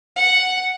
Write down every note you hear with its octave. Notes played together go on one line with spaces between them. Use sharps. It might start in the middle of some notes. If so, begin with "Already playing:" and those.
F#5